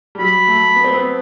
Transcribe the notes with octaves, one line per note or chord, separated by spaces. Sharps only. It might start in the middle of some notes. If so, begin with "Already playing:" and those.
G3
F#3 B5
A3
B3
C4
B3